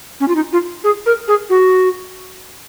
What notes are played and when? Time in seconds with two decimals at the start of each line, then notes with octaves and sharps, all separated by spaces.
0.20 C#4
0.28 F4
0.35 D#4
0.53 F4
0.84 G#4
1.06 A#4
1.28 G#4
1.50 F#4